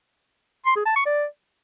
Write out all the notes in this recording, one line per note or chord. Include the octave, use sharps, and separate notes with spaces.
C6
G#4
A5
C#6
D5